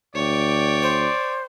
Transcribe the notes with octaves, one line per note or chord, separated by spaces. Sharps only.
D2 C#5 D5 G5
C5